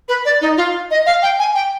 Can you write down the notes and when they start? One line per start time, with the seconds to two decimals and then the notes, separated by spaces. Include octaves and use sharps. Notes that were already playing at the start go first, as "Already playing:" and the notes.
0.08 B4
0.25 D5
0.41 D#4
0.57 F4
0.90 D#5
1.06 F5
1.22 G5
1.39 G#5
1.55 G5